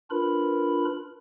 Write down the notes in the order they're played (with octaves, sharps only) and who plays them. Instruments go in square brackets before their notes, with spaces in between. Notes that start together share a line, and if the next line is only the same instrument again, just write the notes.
[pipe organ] D4 F4 A#4 B4 B5